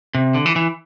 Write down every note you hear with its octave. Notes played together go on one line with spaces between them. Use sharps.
C3
D3
E3
E3